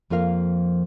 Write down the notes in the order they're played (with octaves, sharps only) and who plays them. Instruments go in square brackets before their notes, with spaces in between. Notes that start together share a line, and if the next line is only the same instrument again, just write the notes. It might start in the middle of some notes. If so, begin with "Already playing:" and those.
[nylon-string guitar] F2 F3 A#3 F4 A#4 F5